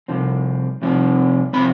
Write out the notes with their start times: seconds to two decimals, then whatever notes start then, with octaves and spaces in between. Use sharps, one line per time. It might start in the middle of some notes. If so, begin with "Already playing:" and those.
0.08 C2 C3 F3 C4
0.82 C2 C3 F3 C4
1.53 C3 F3 C4 B5